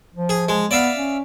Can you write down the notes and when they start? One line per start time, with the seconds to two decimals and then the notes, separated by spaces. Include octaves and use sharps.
0.15 F3
0.29 G#4
0.49 G#3
0.71 B3 D5 E5 F5
0.96 C#4